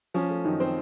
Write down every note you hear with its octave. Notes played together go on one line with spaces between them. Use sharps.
F3 C#4
A3
F#2 D#3 D#4
C4 C5